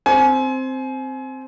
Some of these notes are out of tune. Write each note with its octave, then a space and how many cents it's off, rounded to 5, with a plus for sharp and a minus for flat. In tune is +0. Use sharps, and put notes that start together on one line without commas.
C4 +0 G#5 +30